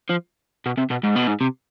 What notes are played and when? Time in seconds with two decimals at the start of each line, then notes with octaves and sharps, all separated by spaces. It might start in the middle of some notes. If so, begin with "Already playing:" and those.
0.09 F3
0.66 B2
0.78 C3
0.91 B2
1.04 G#2
1.16 B2
1.28 G#2
1.41 C3